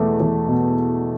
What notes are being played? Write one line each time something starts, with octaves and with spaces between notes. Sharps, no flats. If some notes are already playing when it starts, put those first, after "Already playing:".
Already playing: E2 B2 A3
E2
B2